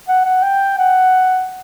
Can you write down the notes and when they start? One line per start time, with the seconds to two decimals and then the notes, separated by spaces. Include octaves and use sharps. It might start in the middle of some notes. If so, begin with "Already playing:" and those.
0.09 F#5
0.25 F#5
0.43 G5
0.79 F#5